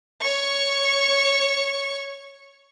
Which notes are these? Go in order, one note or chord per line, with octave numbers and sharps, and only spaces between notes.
C#5 C#6